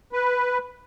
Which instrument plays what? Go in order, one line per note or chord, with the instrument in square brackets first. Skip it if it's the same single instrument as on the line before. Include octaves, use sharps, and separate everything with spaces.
[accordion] B4